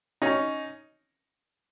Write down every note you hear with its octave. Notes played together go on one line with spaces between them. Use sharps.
C#4 D#4